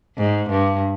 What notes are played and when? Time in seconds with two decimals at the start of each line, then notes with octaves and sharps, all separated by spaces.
0.18 G#2
0.50 G2